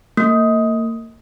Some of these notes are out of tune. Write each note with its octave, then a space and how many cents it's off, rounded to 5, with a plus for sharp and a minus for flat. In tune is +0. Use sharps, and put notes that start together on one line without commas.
A#3 -35